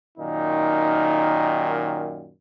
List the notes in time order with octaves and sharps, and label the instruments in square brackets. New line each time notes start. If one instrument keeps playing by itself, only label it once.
[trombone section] F#2 A#2 D#3 [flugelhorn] D#4